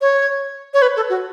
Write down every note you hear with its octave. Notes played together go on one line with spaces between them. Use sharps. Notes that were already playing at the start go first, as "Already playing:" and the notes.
C#5
C#5
B4
A4
F#4